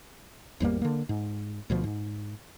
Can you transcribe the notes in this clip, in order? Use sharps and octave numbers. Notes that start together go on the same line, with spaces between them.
G#1 E2 G3 A#3
D3 A#3
G#2
D2 B2 F3
G#2